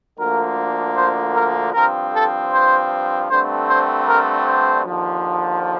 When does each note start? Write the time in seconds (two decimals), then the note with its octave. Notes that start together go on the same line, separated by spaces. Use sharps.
0.18 D2 D3 F3 A#3 A#4
0.95 C5
1.35 A#4
1.73 G2 F3 C4 A#4
2.12 A4
2.52 C5
3.29 G2 D3 A3 C4 C5
3.68 C5
4.07 A#4
4.46 C5
4.85 D#2 D3 F3